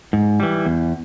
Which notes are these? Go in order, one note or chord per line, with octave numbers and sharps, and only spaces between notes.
G#2
E3 G3
E2